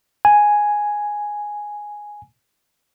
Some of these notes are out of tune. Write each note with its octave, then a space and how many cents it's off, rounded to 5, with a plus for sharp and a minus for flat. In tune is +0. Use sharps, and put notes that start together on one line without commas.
G#5 +0